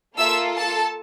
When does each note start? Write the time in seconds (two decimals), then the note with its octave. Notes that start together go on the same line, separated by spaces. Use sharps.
0.18 A#3 F4 A4 E5 E6
0.58 A4 A5